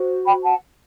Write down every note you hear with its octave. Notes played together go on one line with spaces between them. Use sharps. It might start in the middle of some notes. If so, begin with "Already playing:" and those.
Already playing: F#4 C5
G5 B5
F#5 A5